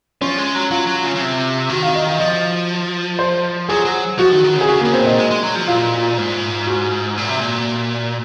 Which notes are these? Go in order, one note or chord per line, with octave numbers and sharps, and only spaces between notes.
F3 C#4
G#3
F#3
F#3 F4
F#3
C#3
C#3
C3
D#3 F#4
F5
D#5
F5
F3 D#5
C5
F#3 G#4
F#3
F3 F#4
D#3
D#3
C#3
G#4
C#3 F#4
C#3 A#3
C4
A#2
D#4
G#3
G#3
F#3
F3
A#2 F4
G#2
F#4
A#2
C3
A#2